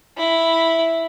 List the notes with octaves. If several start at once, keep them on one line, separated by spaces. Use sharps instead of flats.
E4